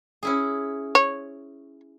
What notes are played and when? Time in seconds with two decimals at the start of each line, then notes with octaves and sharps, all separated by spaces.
0.23 C#4 E4 G#4
0.95 C#5